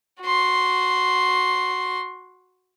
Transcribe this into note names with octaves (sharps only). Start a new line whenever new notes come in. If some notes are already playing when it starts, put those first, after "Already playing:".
F#4 C6